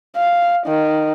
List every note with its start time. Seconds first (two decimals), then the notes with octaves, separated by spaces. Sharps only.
0.17 F5
0.67 D#3